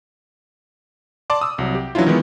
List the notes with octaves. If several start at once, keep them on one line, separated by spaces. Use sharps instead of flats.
D5 A5 C6 D6
D#6 E6
C2 F#3
G4
E3 F#3 C#4 D4 E4 F4
D#3 E3 G#3 B3 E4